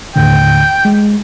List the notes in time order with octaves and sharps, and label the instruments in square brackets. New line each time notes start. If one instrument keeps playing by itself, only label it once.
[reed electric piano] D#2 A2 D3 [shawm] G5
[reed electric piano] G#3